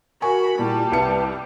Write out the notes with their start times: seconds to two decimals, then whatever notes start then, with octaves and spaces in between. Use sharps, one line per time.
0.22 F#4 A#4 G#5 B5 C#6
0.59 A#2 G3 E4 A5
0.92 C2 B4 C#7